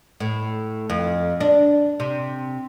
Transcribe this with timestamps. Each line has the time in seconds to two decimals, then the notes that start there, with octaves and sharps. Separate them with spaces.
0.20 A2
0.90 F2
1.40 D4
2.00 C3